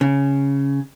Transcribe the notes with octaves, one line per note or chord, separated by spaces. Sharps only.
C#3